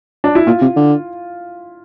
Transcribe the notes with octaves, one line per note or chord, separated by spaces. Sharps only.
D4
E4
A#2 F4
C3
D3